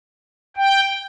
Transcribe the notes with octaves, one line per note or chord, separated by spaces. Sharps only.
G5